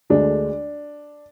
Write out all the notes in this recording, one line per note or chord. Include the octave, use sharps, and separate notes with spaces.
D2 D3 G#3 D4